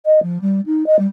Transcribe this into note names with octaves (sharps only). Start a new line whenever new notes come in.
D#5
F3
G3
D#4
D#5
G3